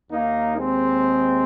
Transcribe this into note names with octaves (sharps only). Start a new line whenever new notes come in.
D#2 D#3 A#3 D#4
G#3 C4